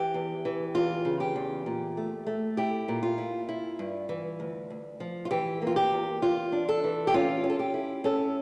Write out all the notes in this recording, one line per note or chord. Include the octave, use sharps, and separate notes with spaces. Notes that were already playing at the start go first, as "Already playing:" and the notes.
Already playing: E3 G4
E2
E3
E2 F4
C#3
G4
E2
A#2
A3
A3
E4 G4
A#2
F4
E4
E4
G2
E3
D2
D2
F3
F4
E3 G4
A#3
F4
G4
E2
E2 F4
D4
A4
E3
G4
C#4 F4
C#4
A4
G4
E4
C#4 A4